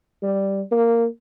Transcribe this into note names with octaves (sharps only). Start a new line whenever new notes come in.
G3
A#3